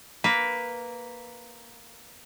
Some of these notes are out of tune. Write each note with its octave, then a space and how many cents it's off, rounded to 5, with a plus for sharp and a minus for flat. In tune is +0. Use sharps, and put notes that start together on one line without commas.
A#3 +0 B4 +0